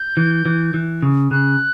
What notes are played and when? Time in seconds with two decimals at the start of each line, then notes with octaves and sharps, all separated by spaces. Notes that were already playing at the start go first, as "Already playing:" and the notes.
Already playing: G6
0.17 E3
0.46 E3
0.74 E3
1.02 C#3
1.31 C#3 F#6